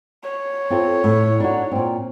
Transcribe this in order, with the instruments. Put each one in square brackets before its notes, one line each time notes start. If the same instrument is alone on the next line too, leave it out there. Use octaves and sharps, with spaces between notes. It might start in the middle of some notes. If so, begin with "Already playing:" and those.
[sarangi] C#5
[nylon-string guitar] C4 F4 A4
A2
D4 D#4 F#4
A#2 C4